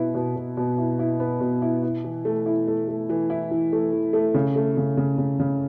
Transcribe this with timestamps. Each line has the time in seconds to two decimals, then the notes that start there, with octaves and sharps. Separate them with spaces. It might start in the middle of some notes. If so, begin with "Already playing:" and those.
Already playing: B2 B3 E4
0.15 B2
0.36 B2
0.57 B2
0.78 E4
0.99 E4
1.20 B3
1.41 B2
1.62 E4
1.83 E4
2.04 E3
2.25 A3
2.46 E4
2.67 A3
2.88 A3
3.09 E3
3.30 E4
3.51 E3
3.72 A3
3.93 E3
4.13 A3
4.34 C#3
4.56 A3
4.77 C#3
4.97 C#3
5.18 C#3
5.40 C#3